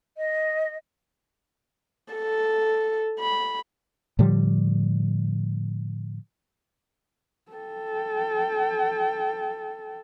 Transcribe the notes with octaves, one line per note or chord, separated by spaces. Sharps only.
D#5
A4
B5
A2 D3 F3 G3
A4 G5